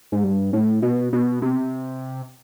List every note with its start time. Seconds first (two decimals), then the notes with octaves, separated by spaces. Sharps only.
0.12 G#2
0.24 G2
0.53 A2
0.82 B2
1.13 B2
1.42 C3